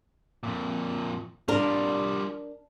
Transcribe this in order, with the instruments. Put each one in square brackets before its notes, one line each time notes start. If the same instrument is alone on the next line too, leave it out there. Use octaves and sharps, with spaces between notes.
[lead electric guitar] F2 A#2
[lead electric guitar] G3 F4 [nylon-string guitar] D4 A#4